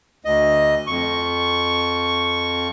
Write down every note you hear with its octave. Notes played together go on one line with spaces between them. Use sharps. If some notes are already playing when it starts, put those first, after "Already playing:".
D2 D#5
F2 C#6